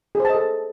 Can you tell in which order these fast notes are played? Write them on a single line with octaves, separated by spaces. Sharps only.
G#4 C5 A5 D#5 A4